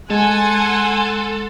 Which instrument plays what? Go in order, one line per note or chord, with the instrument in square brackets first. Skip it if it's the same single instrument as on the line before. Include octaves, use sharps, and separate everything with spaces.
[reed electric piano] G#3 [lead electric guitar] A4 [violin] F#5 C6 [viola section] G#5